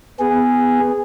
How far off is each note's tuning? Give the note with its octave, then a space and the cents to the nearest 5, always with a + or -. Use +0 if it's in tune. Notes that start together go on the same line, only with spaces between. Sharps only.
B3 +15 G#4 -10